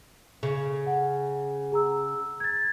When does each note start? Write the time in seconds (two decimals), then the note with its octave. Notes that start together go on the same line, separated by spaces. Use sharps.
0.43 C#3
0.87 F#5
1.72 G#4 A#5 E6
2.40 G#6 A6